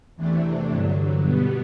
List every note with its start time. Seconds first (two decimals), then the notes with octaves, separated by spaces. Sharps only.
0.16 E2 C3 E3 A3 D4
0.69 G2 D3 F#3
1.21 B2 G3 B3